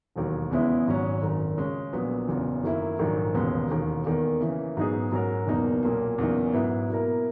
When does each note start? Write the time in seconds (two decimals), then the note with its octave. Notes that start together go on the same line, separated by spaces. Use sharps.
0.16 E1 D#2 D#3 F#3
0.51 E2 C#3 G#3 B3 E4
0.87 G#1 G#2 F#3 C#4
1.22 G#1 F#2 D#3
1.57 C#3 G#3 C#4
1.93 A#1 A#2 F#3 B3
2.29 F#1 E2 C#3
2.63 F#2 D#3 A#3 E4
2.99 A#1 G#2 D#3 F#3
3.34 E1 D#2 C#3 G#3 B3
3.70 E1 D#2 D#3
4.05 E2 D#3 A#3
4.40 C#3 E3 A#3
4.77 G#2 F#3 B3 D#4 G#4
5.12 G#2 F#3 C#4 F#4 A#4
5.47 F#1 E2 B2 A#3 D#4
5.83 B1 A#2 A#3
6.18 E2 C#3 F#3 A#3 D#4
6.53 G#2 F#3 B3 E4
6.89 B2 A#3 E4 A#4